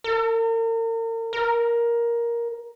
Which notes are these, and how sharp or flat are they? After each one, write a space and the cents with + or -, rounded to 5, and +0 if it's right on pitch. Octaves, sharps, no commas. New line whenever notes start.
A#4 -40
A#4 +10